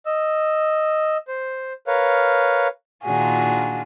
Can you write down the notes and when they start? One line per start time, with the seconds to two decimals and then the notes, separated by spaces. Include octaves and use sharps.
0.06 D#5 E6
1.28 C5
1.87 A#4 B4 C#5 F5
3.04 A#2 D#3 D4 F4 F#4 G#4